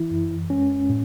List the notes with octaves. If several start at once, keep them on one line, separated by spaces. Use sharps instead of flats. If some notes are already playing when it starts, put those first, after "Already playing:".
Already playing: E3 E4
F#2
G#3 C#4
A2